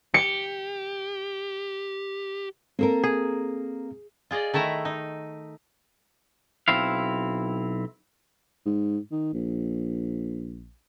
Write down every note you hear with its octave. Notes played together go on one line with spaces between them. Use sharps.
G4 C#7
A#3 C4 A4 A#4
G#4
F4 G#4 D5 D#5
D#3 A3 E4 E5 A#5
D#4
B1 C4 E4 F5
G#2
D#3
A#1